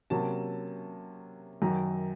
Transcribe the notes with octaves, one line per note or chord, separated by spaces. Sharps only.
C3 F#3 A#3 C#4 A5
F#2 D#3 F#3 A#5